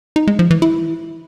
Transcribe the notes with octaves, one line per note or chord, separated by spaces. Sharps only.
D#4
G#3
F3
E3
E4